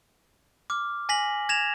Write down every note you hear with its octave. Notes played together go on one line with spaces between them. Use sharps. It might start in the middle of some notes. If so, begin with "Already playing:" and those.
D6 F6
G#5 A#6 B6 F#7
G#6 A#6 E7 F7